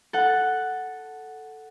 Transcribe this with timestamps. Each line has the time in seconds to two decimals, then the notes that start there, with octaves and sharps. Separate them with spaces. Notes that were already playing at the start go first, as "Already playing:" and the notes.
0.13 A4 F#5